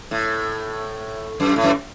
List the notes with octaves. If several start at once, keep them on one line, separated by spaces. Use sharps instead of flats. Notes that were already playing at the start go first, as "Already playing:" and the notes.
A2
F#2
A2
F#2